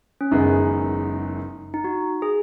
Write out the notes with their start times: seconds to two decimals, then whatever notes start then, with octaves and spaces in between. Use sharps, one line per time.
0.21 C#4
0.31 F#1 F#2 D#3 G#3 B3 D#4
1.74 D#4
1.84 F#4
2.22 G#4